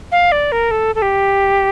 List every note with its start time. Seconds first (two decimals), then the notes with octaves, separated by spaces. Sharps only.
0.12 F5
0.32 D5
0.52 A#4
0.71 A4
0.95 A4
1.02 G4